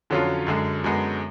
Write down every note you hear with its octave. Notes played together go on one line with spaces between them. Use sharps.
F2 D3 F#3 C#4 F4
F#2 D3 G#3
F#2 D3 G#3 B3